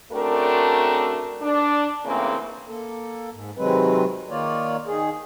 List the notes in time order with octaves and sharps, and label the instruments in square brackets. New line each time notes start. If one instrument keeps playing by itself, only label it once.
[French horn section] C#3 A3 C4 D4 F#4 A#4
D4
G#2 C#3 E3 A3 A#3 C4
[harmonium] A#3 A4
G#2
C3 D#3 F#3 G#3 C4 B4
D#3 A#3 F4 C#5 D5
D#3 G#4